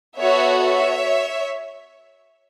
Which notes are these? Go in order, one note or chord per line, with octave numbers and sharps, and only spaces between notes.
B3 F#4 A4 C#5 E5
C#5 E5